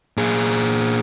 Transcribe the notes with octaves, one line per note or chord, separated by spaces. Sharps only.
A#2 G#4